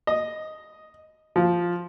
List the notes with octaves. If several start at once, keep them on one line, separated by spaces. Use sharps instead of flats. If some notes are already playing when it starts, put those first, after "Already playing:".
D#5
F3